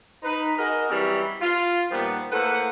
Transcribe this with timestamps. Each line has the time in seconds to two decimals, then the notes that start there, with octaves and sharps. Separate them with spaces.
0.23 D#4 B4
0.57 F#4 G#4 A#4 D#5
0.89 E3 F#3 G3 C4 C#4
1.40 F4
1.90 A#2 D#3 F3 G3 B3
2.32 A2 A#3 A4 B4 C5 F#5